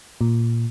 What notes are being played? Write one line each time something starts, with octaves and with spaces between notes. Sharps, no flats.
A#2